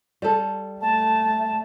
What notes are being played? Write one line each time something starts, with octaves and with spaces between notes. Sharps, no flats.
G3 A4
A3 A5